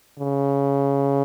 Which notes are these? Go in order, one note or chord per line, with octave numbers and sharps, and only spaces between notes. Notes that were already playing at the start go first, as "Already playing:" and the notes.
C#3